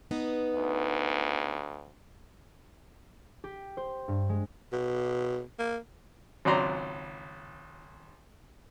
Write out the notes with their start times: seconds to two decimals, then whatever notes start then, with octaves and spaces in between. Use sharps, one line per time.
0.11 B3 D#4 B4
0.56 D2
3.44 G4
3.77 C5
4.08 G2
4.29 G#3
4.72 B2
5.59 A#3
6.45 G#1 C#2 F#3 D5 A#5 C6